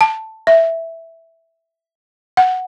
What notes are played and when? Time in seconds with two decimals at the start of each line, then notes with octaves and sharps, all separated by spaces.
0.01 A5
0.47 E5
2.37 F#5